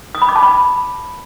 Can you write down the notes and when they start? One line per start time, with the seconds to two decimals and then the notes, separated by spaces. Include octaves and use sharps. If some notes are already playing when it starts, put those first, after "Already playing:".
0.15 D#6
0.22 B5
0.29 D6
0.36 A5
0.43 B5